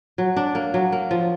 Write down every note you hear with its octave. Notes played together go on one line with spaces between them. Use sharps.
F#3
D4
A#3
F#3
A#3
F3